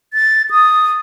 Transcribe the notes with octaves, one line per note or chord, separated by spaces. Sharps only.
A6
D#6